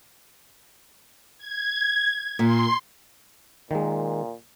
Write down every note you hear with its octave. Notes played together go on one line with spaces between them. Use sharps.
G#6
A#2 C6
A#2 D#3 G#3